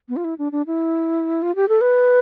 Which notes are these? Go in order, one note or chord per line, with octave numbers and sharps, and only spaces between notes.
B3
F4
E4
D4
D4
E4
F4
G4
A4
B4